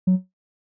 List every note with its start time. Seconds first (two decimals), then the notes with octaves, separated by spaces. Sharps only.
0.07 F#3